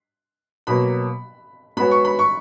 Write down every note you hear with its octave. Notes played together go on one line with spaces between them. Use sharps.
B2 F#3 A#3 B5
G#3 B3 F#4 C#5 B5
C#6
B5
C#6